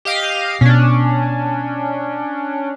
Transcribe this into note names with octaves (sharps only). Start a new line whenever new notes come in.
G4 D#5 F5
B2 C#4 D4